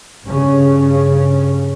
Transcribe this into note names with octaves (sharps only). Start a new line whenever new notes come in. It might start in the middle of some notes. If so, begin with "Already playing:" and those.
G2 C#3 C#4